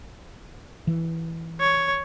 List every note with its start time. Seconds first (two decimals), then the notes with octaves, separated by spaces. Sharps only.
0.87 E3
1.61 C#5